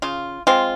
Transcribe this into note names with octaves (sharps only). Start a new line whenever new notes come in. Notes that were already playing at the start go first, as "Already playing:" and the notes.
C#3 F4
G#3 C4 F4